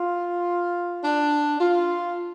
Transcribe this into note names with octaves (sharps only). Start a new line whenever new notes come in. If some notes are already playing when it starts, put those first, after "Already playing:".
Already playing: F4
D4
F4